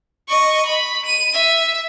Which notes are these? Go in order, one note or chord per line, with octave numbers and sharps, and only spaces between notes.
D#5 C#6
B5
D#7
E5